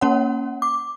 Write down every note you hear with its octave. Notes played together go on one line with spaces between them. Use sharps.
A#3 C#4 C#5 F#5
D6